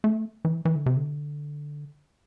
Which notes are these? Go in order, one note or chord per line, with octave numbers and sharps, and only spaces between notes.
A3
E3
E3
D3
C3
D3